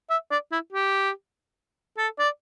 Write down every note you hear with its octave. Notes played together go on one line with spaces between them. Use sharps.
E5
D5
E4
G4
A4
D5